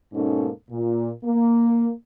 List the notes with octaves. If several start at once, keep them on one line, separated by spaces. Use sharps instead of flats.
G#2 B2 A#3 C#4 D#4 A4
A#2
A#3